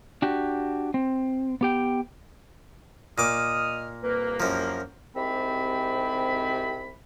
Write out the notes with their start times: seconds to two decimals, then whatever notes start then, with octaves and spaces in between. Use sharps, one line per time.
0.22 D4 F#4 G4
0.94 C4
1.61 B3 G4 G5
3.18 A#2 D#5 D6 D#6 F6
4.03 C2 A#3 B4
4.40 F#2 F3 A#5
5.16 C2 G#2 C3 C4 B5